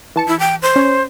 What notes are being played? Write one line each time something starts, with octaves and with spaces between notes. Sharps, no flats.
E3 A5 C#7
E4
G5
C5
C#4 C#5